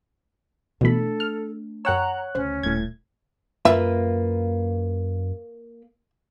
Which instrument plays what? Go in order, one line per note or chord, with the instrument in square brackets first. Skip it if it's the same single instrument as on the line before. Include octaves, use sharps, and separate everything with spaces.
[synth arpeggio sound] B2 E3 B5 [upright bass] A3 D4 [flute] A4
[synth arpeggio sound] F6
[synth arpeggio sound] F#2 G5 E6 [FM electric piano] C#5 F#5 F#6 [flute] A#5
[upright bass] D2 C#3 [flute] C#4 [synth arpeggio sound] C5
[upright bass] D#1 [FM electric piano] A2 G#6
[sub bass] F#2 [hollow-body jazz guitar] A#3 F4 B4 [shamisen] E5